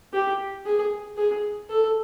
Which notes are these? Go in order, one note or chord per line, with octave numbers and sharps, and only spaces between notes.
G4
G#4
G#4
A4